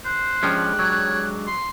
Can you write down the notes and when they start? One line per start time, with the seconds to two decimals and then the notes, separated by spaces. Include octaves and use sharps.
0.05 C5 F#6
0.43 F3 G#3 C#4 D4 G4
0.79 F#3 C#5
1.47 C6